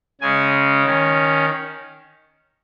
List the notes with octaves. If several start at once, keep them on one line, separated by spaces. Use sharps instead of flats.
C#3 G#3 C#4 G#5
D#3 C#4